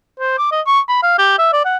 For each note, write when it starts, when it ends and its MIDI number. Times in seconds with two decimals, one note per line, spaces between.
0.20 0.37 72
0.38 0.49 86
0.52 0.61 75
0.66 0.80 85
0.89 0.99 83
1.03 1.13 77
1.18 1.36 67
1.39 1.51 76
1.53 1.64 74
1.65 1.77 78